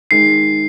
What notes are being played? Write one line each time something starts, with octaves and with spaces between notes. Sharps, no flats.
D#3 G#3 D#4 C7